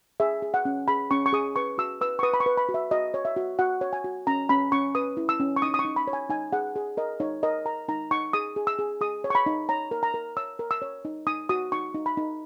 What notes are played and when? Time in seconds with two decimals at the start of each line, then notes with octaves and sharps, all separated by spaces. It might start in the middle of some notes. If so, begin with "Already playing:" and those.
0.20 G#4 E5
0.42 G#4
0.54 F#5
0.65 C#4
0.88 G#4 B5
1.11 C#4 C#6
1.26 C#6
1.33 G#4 D#6
1.56 B4 C#6
1.78 F#4 E6
2.01 B4 E6
2.19 C#6
2.23 B4 D#6
2.34 B5
2.40 C#6
2.46 B4
2.57 B5
2.69 F#4
2.74 E5
2.91 F#4 D#5
3.14 C#5
3.25 E5
3.36 F#4
3.59 F#4 F#5
3.81 C#5
3.93 G#5
4.04 F#4
4.27 C#4 A#5
4.49 C#4 B5
4.72 C#4 C#6
4.95 B4 D#6
5.17 E4
5.29 E6
5.40 C#4
5.56 C#6
5.62 D#4 D#6
5.74 D#6
5.79 C#6
5.85 D#4
5.96 B5
6.07 C#5
6.13 G#5
6.30 D#4 G#5
6.53 G#4 F#5
6.76 G#4
6.97 A#4 D#5
7.20 D#4 C#5
7.43 A#4 D#5
7.66 A#4 A#5
7.88 D#4 A#5
8.11 D#4 C#6
8.33 G#4 D#6
8.56 G#4
8.67 E6
8.79 G#4
9.01 G#4 D#6
9.24 C#5
9.30 C#6
9.35 B5
9.46 D#4
9.69 C#5 A#5
9.91 A#4
10.03 A#5
10.14 A#4
10.37 C#5 E6
10.59 A#4
10.71 E6
10.82 C#5
11.05 D#4
11.27 D#4 D#6
11.49 F#4 D#6
11.72 D#4 C#6
11.94 D#4
12.06 B5
12.17 D#4